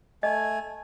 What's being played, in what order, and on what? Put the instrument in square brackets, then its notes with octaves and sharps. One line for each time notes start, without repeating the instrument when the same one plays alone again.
[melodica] A3 G#5 [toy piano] D#5